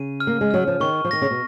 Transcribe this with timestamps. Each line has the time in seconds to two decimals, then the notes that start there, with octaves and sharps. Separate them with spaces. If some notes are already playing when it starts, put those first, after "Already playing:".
Already playing: C#3 D#7
0.20 F6
0.27 A#3
0.41 G#3
0.51 F#3 F6
0.67 F3
0.80 D#3 C#6
1.05 F3
1.11 D#3 A#6
1.22 C#3
1.31 B2